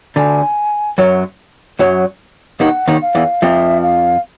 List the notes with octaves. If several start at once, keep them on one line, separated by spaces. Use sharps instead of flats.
D2 D3 G#5
F#2 F#3
F#2 F#3
D#2 D#3 F#5
D#2 D#3
F5
E2 E3
F2 F3 E5
F5